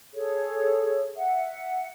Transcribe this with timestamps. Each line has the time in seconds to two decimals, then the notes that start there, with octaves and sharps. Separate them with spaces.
0.14 G#4 A4 C#5
1.15 E5 F#5